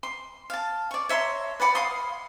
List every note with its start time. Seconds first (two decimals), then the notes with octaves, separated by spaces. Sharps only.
0.03 C6
0.50 F5 A5
0.91 D5 C#6
1.09 C#5 E5 A#5 C6
1.60 B4 D5 F#5 B5
1.75 F5 F#5 C6 D#6